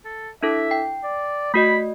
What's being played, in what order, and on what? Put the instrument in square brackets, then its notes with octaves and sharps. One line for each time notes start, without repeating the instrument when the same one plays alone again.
[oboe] A4
[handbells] D4 E4 A4 [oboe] E5
[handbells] G5
[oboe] D5
[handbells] A3 F#4 D#5 [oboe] B5